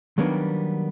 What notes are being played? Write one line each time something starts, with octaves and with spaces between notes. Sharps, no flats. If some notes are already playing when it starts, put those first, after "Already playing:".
D#3 F#3 G3 A#3 B3 D4